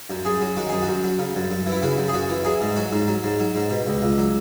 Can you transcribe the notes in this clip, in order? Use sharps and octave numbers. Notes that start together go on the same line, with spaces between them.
F#2
F#2 G#4
F#3
D#3 F#4
F#2 G#4
F#4
F#2
F#3
C#3
F#2
F#2
E3
E4
C#3 F#4
F#2
G#4
F#2 F#4
E3
F#3 G#4
G#2
F#3 F#4
G#2
F#3
G#2
F#3
G#2
B2
C#2
C#2
F#3